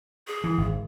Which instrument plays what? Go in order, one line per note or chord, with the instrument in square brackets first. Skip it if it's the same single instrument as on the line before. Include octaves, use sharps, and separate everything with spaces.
[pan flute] G#4
[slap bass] E3
G#1